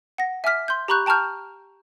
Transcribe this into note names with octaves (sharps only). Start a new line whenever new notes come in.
F#5 A#6
E5 G#5 D6 F6 B6
C6 G6
G4 A#5 B5 C#6 F#6 G6
G5 A5 A#5 C#6 F6 G6